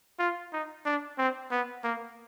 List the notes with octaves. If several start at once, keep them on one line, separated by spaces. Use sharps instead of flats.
F4
D#4
D4
C4
B3
A#3